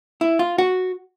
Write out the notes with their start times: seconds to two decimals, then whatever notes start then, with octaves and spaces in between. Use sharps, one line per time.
0.21 E4
0.39 F4
0.58 F#4